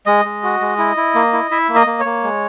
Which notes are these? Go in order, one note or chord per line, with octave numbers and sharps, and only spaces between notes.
G#3 D#5
G#3
F#4
G#3
E4
E4
A#3
E4
E4 E5
A#3
D#5
A#3
C#5
A#3
G#3